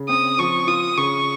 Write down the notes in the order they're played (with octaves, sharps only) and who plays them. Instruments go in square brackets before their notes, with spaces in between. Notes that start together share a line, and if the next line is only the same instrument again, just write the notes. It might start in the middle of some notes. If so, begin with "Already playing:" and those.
Already playing: [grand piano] C#3
[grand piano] C4 [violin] D#6
[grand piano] F3 [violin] C#6
[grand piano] F4 [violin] D#6
[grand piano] C#3 [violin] C#6